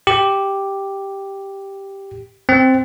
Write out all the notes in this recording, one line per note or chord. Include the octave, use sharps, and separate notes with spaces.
G4
C4